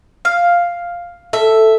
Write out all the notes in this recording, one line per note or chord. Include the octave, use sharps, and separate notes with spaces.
F5
A4 E5